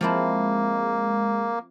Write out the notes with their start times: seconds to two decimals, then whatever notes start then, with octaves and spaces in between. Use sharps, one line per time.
0.01 F3 G#3 A#3 C4 E4